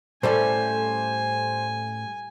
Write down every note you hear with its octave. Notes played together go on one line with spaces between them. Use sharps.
A2 G3 A3 C#4 A4 C5 G#5